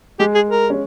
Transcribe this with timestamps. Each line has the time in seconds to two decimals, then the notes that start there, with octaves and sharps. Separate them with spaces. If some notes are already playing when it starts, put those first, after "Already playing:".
0.19 G#3 G4
0.35 G#4
0.49 A#4
0.70 C#4